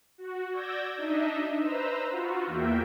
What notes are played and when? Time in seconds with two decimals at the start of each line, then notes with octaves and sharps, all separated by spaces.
0.18 F#4
0.51 D5 E6 G6 G#6 A#6
0.97 D4 D#4 D#5 E5
1.58 B4 C5 A#5 E6
2.10 F4 F#4
2.46 E2 A#3 E5 G5